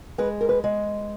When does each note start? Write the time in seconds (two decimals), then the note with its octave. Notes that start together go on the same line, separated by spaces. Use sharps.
0.18 G#3 B4
0.41 A#4
0.49 B4
0.64 G#3